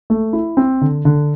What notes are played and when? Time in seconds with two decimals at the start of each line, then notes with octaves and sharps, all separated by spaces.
0.10 A3
0.33 E4
0.57 C4
0.81 D3
1.05 D3